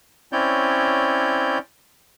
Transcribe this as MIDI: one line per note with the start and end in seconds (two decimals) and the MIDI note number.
0.32 1.58 60
0.32 1.58 61
0.32 1.58 64
0.32 1.58 73
0.32 1.58 74
0.32 1.58 91